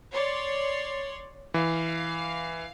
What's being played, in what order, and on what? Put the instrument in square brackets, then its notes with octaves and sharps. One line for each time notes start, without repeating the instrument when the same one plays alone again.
[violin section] C#5 D5 C6
[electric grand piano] E3 [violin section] F5